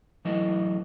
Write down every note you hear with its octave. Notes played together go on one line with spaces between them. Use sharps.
E3 F#3 A3 E4 A4 D#5